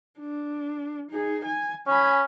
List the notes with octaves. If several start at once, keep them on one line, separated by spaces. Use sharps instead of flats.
D4
D#4 G#4
G#5
C#4 G#5 B5